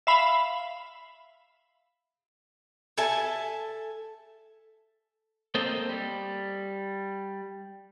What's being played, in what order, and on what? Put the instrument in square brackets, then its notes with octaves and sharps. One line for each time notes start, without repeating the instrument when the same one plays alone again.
[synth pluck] E5 F5 B5
[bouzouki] A4 E5 G#5 A5
[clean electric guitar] A#3 C4 A4 C5 D#5
G3